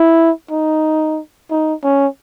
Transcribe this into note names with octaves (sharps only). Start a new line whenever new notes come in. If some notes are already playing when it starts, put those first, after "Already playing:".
Already playing: E4
D#4
D#4
C#4